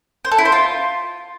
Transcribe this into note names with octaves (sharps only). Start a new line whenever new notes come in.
C5
A4
E4
C5
F4